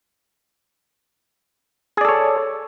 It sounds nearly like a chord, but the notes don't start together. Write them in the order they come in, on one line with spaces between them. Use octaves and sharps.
G#4 D5 A4 C#5